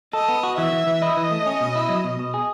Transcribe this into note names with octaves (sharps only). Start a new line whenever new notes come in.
A4 D#5
B3
F#4
E3 E5
E3
E3
E4 D#5
E3
A3
C#4
B2
E4
F#3
B2
B2
G#4